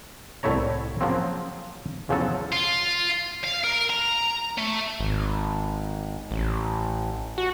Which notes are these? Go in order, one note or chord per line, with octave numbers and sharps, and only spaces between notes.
C2 A2 A3 E4 C#5 A#5
C#3 F3 F#3 A#3 C4
E2 C#3 F3 F#3 A4 A5
F4
F5
A#4
A#5
A3
G#1
A1
F#4